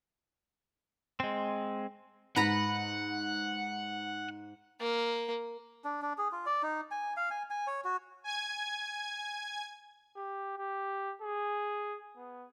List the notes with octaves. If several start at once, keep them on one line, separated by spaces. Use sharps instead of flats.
G#3 C4
G#2 B4 F#5 A#5 B5
A#3
D4
D4
G#4
F4
D5
D#4
G#5
F5
G#5
G#5
C#5
F#4
G#5 G#6
G4
G4
G#4
B3